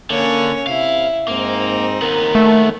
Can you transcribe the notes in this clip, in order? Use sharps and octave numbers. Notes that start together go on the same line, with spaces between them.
D3 A#3 C#4 C#5
C3 E4 F5
G#2 A#3 C4 D#4
D#2 B3 A#4
A3